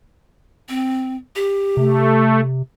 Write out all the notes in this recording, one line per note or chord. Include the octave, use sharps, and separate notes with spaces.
C4
G4
C3 A3